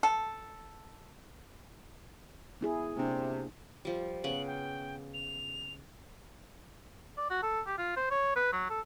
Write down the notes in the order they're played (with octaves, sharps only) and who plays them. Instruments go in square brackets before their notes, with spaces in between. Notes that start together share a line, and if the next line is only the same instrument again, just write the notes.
[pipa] A4
[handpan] B3 E4 G#4
[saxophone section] C3 [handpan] A#3 D4
[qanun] F3 G3
[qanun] C#3 B3 D6 [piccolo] F#7
[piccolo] G5
F7
[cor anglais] D5
F#4
A4
G4
F4
C5
C#5
B4
F#3
A4